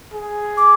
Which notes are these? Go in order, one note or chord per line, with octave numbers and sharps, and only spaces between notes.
G#4
D6